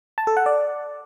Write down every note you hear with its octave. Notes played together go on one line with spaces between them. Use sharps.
A5
A4
F#5
D5